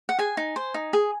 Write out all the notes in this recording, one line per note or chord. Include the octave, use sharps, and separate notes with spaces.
F#5
G#4 G#5
D#4
C5
D#4
G#4